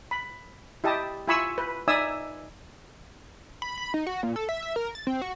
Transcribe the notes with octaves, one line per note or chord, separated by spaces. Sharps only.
B5
E4 G4 D#5 A5 D#6
E4 F4 G#5 B5 C#6 E6
B4
D#4 D5 E5 G#5 D#6 E6
B5
B5
D#4
F#4
A#2
A4
E5
E5
A#4
A6
C4
F#4